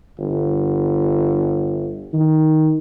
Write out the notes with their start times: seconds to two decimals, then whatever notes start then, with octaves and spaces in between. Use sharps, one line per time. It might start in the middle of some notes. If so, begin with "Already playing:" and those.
0.18 G1
2.13 D#3